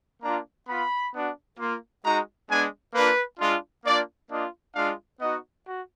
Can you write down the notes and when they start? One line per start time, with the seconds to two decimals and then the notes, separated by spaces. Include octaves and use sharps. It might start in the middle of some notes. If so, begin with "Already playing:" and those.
0.23 A#3 D4 F4 A#5
0.68 B3 F4 B5
1.14 B3 D4 F#4
1.59 A#3 F4
2.04 G#3 D#4 F#4 A#5
2.49 G#3 B3 D4 G#5
2.94 A#3 D4 F4 B4
3.39 G#3 D4 F4
3.85 A#3 D4 F4 D5
4.30 A#3 D4 F4 D#5
4.75 G#3 D4 F4 F5
5.20 B3 D#4 F#4 D#5
5.65 F#4